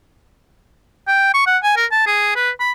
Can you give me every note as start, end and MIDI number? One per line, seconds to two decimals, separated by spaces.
1.08 1.30 79
1.34 1.46 85
1.46 1.58 78
1.63 1.72 80
1.77 1.86 70
1.91 2.05 81
2.06 2.32 68
2.35 2.51 71
2.60 2.72 83